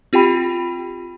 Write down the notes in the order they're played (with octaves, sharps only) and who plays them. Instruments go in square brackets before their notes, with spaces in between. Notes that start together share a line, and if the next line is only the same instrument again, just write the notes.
[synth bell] C4 F4 G4 G5 B5